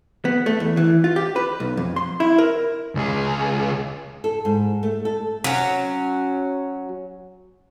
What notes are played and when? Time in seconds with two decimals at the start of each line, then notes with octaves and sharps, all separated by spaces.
0.25 B3
0.46 A3
0.60 E2
0.77 E3
1.04 F4
1.16 G4
1.36 B4
1.60 B1
1.77 F2
1.96 C6
2.20 E4
2.38 A#4
2.95 C#2 G#4
4.24 A4
4.45 G#2
4.83 A3
5.05 A4
5.44 F#3 C#4